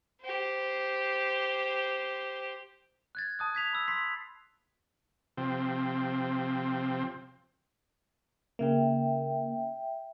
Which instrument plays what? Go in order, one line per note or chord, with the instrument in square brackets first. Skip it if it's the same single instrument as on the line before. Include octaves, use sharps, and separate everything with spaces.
[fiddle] G4 C5
[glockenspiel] F#6 G#6 A6
A5 D#6 F#6
G#6 B6 F7
B5 E6
C6 E6 B6 C7
[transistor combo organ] C3 F3 C4
[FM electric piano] C#3 A#3 [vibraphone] E5 G5